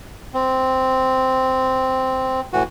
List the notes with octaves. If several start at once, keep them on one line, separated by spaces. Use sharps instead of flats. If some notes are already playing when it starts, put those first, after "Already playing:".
C4
A2 E3 F#4